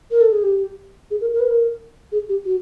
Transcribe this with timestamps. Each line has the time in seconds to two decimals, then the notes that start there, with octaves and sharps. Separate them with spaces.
0.11 A#4
0.21 A4
0.32 G#4
0.43 G4
1.11 G#4
1.21 A#4
1.33 A#4
1.40 B4
1.47 A#4
2.12 G#4
2.29 G4
2.46 F#4